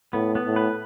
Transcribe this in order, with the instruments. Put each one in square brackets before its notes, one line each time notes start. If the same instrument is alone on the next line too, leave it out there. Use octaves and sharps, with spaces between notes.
[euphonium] A2 [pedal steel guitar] B3
[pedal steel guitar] B3
[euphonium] A2
[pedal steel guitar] B4